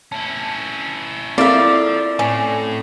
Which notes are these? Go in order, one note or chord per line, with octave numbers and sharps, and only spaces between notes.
C#4 E4 A5
F3 A#3 C4 E4 A4 D5 E5
A2 C#4